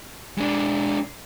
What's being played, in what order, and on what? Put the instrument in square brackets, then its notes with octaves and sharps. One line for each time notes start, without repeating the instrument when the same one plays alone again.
[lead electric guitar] G#3 D4